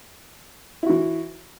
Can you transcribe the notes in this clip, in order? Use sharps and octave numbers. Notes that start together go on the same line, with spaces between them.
E3 E4 F#4